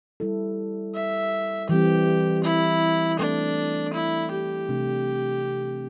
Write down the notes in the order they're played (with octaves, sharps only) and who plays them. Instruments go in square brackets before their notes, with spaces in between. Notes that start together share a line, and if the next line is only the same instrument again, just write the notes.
[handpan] G3 E4 A4
[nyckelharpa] E5
[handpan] E3 G3 C4 [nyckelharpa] G4
[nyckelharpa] E4
[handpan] A3 C4 A4 [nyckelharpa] D4
[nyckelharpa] E4
G4
[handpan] C3 A3 D4